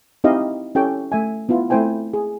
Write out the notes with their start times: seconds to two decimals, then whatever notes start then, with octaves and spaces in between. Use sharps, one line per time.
0.24 C4 D#4 E4 G4 D#5 F5
0.75 C#4 E4 G4 A4 C#5 G5
1.12 A3 E5 G#5
1.49 B3 E4 F4
1.70 A3 C4 E4 C5 G5 G#5
2.14 G#4